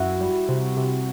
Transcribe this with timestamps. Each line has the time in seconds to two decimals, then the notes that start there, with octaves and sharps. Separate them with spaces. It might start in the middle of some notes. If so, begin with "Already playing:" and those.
Already playing: F#2 E4 F#4
0.21 G3
0.49 C3
0.77 C3